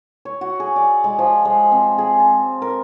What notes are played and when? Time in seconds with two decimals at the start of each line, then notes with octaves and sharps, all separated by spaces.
0.25 C#5
0.41 F#4
0.60 G#4
0.76 D5
1.04 G#3
1.19 F3
1.45 G#3
1.72 C4
1.98 G#4
2.20 A5
2.62 A#4